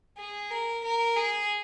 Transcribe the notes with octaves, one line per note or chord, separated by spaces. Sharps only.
G#4
A#4
A#4
G#4